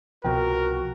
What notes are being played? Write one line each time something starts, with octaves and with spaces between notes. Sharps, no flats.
C2 B2 F3 F#4 A#4 G5